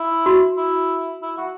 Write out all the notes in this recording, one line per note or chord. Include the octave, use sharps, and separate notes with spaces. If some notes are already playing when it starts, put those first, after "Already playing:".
Already playing: E4
F#4
E4
E4
F#4